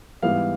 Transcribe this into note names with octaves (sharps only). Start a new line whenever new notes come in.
G#2 E3 G3 B3 F5